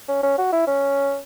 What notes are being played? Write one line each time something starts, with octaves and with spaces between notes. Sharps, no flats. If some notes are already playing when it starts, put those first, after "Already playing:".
C#4
C#4
F#4
E4
C#4